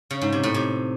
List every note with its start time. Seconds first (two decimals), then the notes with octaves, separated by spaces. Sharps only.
0.10 C#3
0.21 G#2
0.32 C3
0.43 A2
0.54 C3